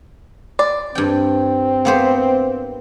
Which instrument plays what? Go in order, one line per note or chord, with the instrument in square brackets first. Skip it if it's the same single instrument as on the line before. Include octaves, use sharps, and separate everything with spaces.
[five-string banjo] D5
[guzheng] G2 G5 [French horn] C4
[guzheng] A#3 B3 C5